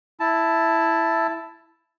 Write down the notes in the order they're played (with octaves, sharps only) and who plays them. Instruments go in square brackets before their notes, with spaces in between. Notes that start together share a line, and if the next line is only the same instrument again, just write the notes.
[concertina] E4 A5